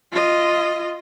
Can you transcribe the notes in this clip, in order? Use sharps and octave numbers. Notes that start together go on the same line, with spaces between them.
F4 D#5